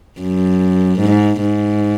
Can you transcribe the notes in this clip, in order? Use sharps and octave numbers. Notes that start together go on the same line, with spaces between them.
F#2
G#2
G#2